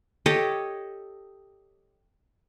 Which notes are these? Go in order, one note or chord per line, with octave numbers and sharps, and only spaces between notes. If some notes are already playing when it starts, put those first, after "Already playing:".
G4 A4 C#5 D#5